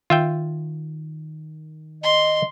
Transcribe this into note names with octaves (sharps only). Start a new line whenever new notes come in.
D#3 F4 E5 G5
D#5 C6